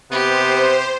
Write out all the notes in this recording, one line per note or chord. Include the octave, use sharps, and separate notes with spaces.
C3 B3 G4 C5